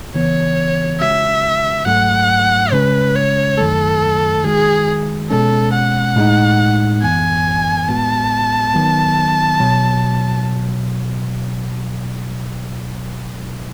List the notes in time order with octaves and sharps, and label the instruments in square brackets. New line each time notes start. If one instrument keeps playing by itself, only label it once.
[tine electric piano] C#3 E3 B3 [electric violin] C#5
[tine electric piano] C#3 G#3 C#4 F#4 [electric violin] E5
[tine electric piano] G#2 F#3 A3 [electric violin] F#5
[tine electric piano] C#3 G#3 C#4 [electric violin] B4
[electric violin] C#5
[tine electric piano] F#2 D#3 F#3 A3 [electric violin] A4
[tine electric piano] D#3 G#3 D#4 F#4 [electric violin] G#4
[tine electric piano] B2 G#3 C#4 [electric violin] A4
[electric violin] F#5
[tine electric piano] A2 G#3 D#4
[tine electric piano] F#2 E3 B3 [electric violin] G#5
[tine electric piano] A2 G#3 B3 F#4 [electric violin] A5
[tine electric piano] D#3 F#3 B3
B2 F#3